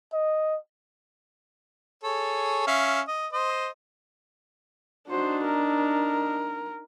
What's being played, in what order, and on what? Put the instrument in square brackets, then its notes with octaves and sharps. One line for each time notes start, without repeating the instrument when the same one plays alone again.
[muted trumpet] D#5
[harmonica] G#4 A4 C#5
C#4 E5 F5
D#5
C5 D#5
[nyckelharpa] D4 D#4 [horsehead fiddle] F#4 C5
[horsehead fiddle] A#4